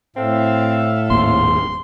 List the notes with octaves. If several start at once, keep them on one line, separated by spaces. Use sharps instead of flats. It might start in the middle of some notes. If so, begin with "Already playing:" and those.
A2 C4 A4 E5 F5
D#1 G#1 A#3 C6